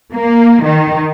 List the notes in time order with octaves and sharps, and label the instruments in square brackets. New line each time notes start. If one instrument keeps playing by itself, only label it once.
[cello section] A#3
D#3